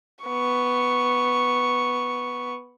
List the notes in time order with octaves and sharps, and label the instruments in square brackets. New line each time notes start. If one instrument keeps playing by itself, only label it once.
[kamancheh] B3 C#6